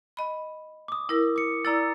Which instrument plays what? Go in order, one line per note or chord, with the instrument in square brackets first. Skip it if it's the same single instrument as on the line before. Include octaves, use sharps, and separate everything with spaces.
[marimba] D#5 B5
[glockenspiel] D6 D#6
[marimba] E4 A#4
[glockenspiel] D6 C#7
[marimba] E4 D5 [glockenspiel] A#5 E6 A6